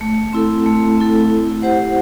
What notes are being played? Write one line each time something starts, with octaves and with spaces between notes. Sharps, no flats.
A3
C4 E4 A4
A3
C4 E4 A4
E4
G4 C5 F#5